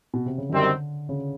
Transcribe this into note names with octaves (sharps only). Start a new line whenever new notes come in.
B2
C3
C#3
F#2 D3 D#3 G3 C4
C#3